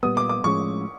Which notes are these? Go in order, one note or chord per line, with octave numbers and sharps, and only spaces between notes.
A#2 G3 B3 D#6
D6
D6
A2 F3 G#3 C#4 C#6